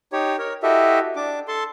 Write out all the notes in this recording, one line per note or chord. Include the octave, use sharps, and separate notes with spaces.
D#4 G4 C#5
A#4 C#5
E4 F#4 G4 A4 D#5 E5
D4 D6
A4 A5 C6